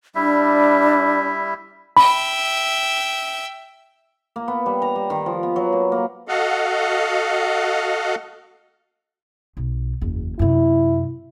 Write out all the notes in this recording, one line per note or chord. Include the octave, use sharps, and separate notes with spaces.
G3 D4 E4 E5
E5 G5 B5
A#3
B3
G3
A#5
G3
D#3
F3
B3
F#3
A#3
A#3
F#4 A4 D#5 F5 F#5
B1
F#1 E2
F#2 C3 E4